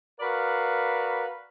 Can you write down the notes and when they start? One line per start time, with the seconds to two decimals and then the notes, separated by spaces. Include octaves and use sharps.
0.20 F#4 A#4 B4 D5 F5